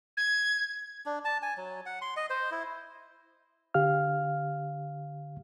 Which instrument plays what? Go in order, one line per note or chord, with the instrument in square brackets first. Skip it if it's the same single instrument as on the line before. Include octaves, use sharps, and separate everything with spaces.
[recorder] G#6
[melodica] D4
A5
G#5
F#3
F#5
C6
D#5
C5
E4
[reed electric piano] D3 G4 F5 F6